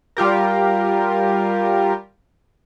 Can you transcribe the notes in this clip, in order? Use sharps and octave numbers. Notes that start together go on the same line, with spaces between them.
G3 F4 G4 A#4